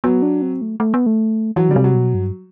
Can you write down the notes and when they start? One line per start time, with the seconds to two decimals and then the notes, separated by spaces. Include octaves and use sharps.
0.04 F#3 B3
0.22 D4
0.42 C4
0.62 A3
0.80 A3
0.94 B3
1.06 A3
1.56 E3 F#3
1.69 D3 G3
1.76 C3
1.84 F#3
1.95 B2
2.14 G2